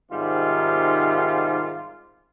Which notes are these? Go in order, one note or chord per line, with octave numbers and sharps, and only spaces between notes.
G#2 C3 D#3 G3 F4